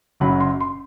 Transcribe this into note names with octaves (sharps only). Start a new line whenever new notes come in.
F#1 F#2 F#3 B5
C6
C6